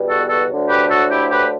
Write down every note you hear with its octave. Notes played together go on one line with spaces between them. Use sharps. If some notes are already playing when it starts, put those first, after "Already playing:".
Already playing: E2 B2 G3
F#4 A4
F#4 A4
D2 D3 F#3
G4 B4
F#4 A4
E4 G4
G4 B4